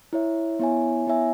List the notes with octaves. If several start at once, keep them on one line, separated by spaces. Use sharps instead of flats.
E4 C#5 E5
B3 E4 C#5 E5 G#5
B3 E4 C#5 E5 G#5